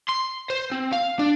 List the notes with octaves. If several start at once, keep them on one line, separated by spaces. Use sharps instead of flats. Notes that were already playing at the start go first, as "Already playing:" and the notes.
C6
C5
C4
F5
D4